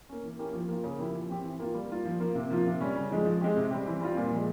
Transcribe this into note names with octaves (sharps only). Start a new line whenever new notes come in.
A#3 C#4
E3
A#3 C#4 E4 G4
F3
A#3 F4
C#3
F3 A#3 E4 G4
F3
C4 G4
E3
A#3 F4
G3
A#3 F4
F3
A#3 F4
C3
F3 A#3 F4
C3
G3 C#4
C#3
F3 G#3
F3
G#3 C4 G4
C3
G3 C4 G4
E3
G3 C4 F4
A#2
F3 G#3